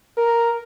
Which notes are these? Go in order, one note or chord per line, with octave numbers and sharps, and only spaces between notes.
A#4